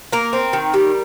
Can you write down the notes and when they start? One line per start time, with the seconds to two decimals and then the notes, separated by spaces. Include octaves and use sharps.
0.13 A#3 A#4
0.33 C4
0.53 D#3
0.74 G3